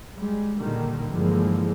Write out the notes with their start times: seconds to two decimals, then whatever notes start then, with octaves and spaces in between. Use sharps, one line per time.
0.16 G3 G#3
0.58 A#2 D3 D#3 G3 A#3
1.10 G2 D3 E3 F3 G#3 A#3